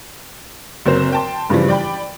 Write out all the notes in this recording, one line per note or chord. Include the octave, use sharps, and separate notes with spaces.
F#1 F#3 C4 C5
G5 A5 C6
G2 C#3 E3 F3 G3
D5 G5 B5